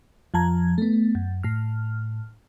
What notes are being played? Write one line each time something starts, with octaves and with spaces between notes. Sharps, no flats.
F2 F3 A5 A#5 G#6
A3 B3
F#2
A2 F6